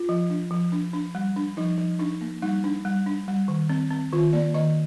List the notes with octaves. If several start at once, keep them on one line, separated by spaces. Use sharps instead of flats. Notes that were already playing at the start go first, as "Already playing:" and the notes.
Already playing: F4
F3
D4
F3
D4
D4
G3
D4
F3 D#4
F3
D4 D#4
A#3
G3 D#4
D4
G3
D4
G3
D#3
C4
C4
D#3 F4
A#3 D5
D#3 D#5